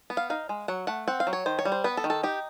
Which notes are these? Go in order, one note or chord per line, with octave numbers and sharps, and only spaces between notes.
B3
F5
D#4 F5
G#3
F#3 F#5
A3 F#5
C4 F#5
F5
F#3
C#5
D#3 C5
C#5
G3
C5
B3 B4
A4
D#3
A4
D#4 G4